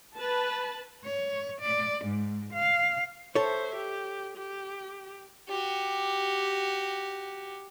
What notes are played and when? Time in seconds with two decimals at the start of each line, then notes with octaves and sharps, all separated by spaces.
0.16 B4 A5
1.05 C#5
1.61 D5
2.05 G#2
2.54 F5
3.35 A4 C5 C#5 E5
3.75 G4
4.37 G4
5.48 F#4 G4